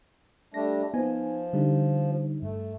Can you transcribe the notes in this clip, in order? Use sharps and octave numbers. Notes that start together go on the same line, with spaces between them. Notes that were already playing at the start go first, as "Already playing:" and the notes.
G3 A3 D4 A#6
F3 B3 D#4 G#5
D3 G3 D#4
G2 A3